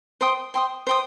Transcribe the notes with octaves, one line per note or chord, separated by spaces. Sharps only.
C5 G5 C6 D#6
C5 G5 C6 D#6
C5 G5 C6 D#6